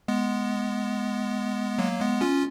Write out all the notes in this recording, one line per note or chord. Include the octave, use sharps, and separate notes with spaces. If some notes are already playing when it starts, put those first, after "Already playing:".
G#3 B3
F#3 A#3
G#3 B3
C#4 F4